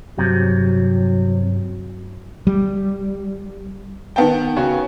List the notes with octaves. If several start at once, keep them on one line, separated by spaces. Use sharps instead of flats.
C2 G2 C3 F#3
G3
D#3 B3 G5 A5
C#3 C#4 F#4